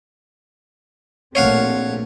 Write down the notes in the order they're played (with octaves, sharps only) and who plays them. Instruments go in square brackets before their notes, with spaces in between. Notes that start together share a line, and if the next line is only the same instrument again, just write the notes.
[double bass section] A#1 A3 C4 [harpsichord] C#5 F5 F#5